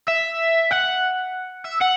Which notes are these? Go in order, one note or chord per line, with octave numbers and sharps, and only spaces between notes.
E5
F#5
E5
F#5